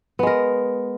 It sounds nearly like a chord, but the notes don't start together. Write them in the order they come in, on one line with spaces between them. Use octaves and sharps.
B3 G#3 A#4